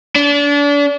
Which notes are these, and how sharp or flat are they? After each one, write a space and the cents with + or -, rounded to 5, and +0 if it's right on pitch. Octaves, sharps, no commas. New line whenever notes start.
D4 -35